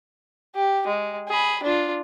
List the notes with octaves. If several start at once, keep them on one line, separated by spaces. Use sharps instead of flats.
G4
G#3
G#4 B5
D4 F4